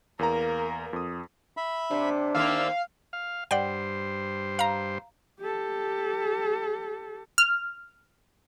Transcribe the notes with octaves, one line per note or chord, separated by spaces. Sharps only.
E2 A#3 A#4 A#5
F2 D#6
E5 B5
C3 D4
D#2 A#3 C4 D5 E5 F5 E6
F5
G2 C5 D5 F#5 G5
F5 A#5
G4 A4
F6